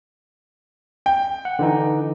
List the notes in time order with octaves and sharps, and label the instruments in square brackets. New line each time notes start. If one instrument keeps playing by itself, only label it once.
[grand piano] G5
[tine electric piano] F#5
D3 E3 D#4